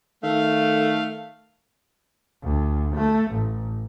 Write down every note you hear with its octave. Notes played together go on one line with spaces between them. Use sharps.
D#3 A3 F5
D2
A3
A1